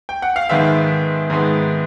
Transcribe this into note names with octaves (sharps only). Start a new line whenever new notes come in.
G5
F#5
F5
G#2 D#3 G#3 B3 E5
G#2 D#3 G#3 B3